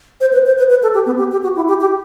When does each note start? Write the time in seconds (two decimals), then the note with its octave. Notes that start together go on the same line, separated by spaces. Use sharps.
0.21 C5
0.33 B4
0.46 C5
0.58 B4
0.70 B4
0.83 A4
0.94 G4
1.06 B3
1.19 G4
1.32 G4
1.43 F#4
1.56 E4
1.68 G4
1.81 G4